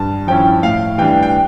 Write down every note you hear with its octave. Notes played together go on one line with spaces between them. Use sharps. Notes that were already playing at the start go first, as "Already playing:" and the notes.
Already playing: G2 A5
F3 C#4 E4 G5
A2 F5
E3 G3 D4 G5
G5